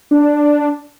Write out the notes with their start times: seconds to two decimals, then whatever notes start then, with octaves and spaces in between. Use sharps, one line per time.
0.11 D4